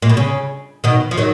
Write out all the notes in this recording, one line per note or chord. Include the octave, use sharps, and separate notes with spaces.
A#2
B2
C#3
B2 D#3
F3
D#3 F#3